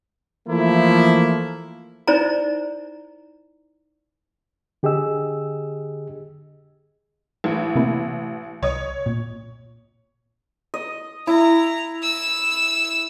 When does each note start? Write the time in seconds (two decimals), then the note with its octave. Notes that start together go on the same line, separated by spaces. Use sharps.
0.48 E3 F3 A3 A#3 E4
2.08 D#4 E4 C5 D5 A#5
4.83 D3 G4 G#4 D#5 E6
7.44 A1
7.75 C3 A#3 E4
8.63 C2 C#5 D#5 D#6
9.06 A#2
10.74 D#5
11.27 E4 A#5
12.03 E6